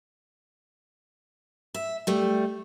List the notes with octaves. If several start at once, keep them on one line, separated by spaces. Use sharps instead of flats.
E5
G3 A3